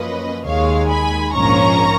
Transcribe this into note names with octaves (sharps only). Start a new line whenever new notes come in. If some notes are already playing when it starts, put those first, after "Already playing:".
Already playing: F#2 F3 A#3 C#4 B4 D#5
D#2 D#3 G#3 C#5 F5
G#5 B5
A#1 G#2 F3 A#3 C#4 A#5 C#6